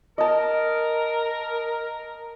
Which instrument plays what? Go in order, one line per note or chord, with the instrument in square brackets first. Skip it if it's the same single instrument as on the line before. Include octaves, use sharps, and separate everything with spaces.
[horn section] A#4 [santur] D#5 A5